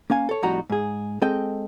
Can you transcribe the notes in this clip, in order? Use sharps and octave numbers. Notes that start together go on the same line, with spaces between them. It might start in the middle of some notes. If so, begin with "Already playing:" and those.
A#3 C#4 F5 G#5
A4 C#5
F2 A2 G3 D#4 F#4 A#5
G#2 G#4
G#3 C4 A4 D#5 G5